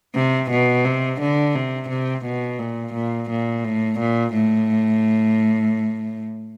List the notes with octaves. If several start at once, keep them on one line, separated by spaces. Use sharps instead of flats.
C3
B2
C3
D3
C3
C3
B2
A#2
A#2
A#2
A2
A#2
A2